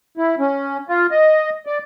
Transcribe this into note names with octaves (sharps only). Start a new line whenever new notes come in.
E4
C#4
F4
D#5
D5